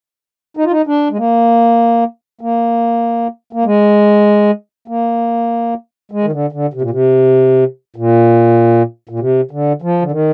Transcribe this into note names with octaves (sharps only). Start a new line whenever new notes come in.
D#4
F4
D#4
D4
G#3
A#3
A#3
A#3
G#3
A#3
G#3
D#3
D3
D3
C3
A#2
C3
A#2
A#2
C3
D3
F3
D3
D#3